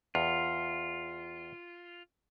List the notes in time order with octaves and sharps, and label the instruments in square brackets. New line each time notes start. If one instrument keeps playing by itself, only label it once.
[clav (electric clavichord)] E2 [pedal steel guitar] F4